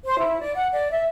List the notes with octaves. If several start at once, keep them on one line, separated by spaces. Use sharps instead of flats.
C5
E4
D5
F#5
D5
E5